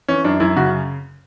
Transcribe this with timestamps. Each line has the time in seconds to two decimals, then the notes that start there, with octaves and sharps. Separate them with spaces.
0.08 E3 C#4
0.24 F#2 D4
0.40 F#2 E4
0.56 C#3 F#4